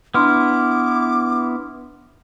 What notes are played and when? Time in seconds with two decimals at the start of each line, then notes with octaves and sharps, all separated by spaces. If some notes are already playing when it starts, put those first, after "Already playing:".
0.14 B3 D4 E4 C6 D6 F6